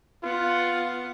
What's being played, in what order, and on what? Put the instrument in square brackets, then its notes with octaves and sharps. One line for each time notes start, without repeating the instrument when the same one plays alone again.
[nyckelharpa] B3 F#5 [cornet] F4